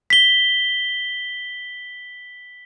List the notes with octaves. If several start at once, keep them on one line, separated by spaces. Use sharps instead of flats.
B6 G7